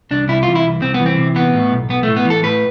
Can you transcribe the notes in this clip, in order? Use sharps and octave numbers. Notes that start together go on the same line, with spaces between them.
C2 D4
C3 E4
E3 F4
E4
C2
C2 C4
B3
E3
C4
C3
E3 B3
A2
B1
B1 B3
A3
A2
B3
E3
A4
A2 B4